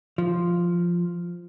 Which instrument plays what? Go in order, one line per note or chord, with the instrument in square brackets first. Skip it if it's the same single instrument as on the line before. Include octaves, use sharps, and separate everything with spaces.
[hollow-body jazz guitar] F3